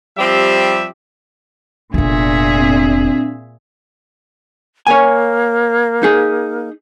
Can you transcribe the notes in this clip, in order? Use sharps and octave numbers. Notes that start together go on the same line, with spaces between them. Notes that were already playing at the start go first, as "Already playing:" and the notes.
F3 G3 C4 G4 E5
F1 A#2 B3 D4 G#4 E5
C4
A#3 C#5 G#5
D#4 G#4